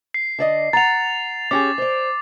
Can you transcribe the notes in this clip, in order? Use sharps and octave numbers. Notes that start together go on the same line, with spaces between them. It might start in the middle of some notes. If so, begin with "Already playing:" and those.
C7
D3 D5 D#5
F#5 A#5 A6 F7
C#4 G4 G#4 D6 A6
C5 D5